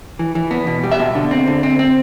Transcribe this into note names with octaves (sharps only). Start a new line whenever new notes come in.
E3
E3
B3
B2
G3
E5
B2
D3
C4
D3
C4
C4